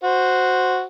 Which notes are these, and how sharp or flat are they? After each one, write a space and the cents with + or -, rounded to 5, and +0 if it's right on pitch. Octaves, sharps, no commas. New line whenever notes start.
F#4 -5 C5 -5